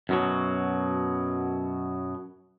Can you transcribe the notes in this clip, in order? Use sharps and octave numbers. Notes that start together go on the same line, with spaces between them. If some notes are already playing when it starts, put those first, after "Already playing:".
F#2 B2 F#3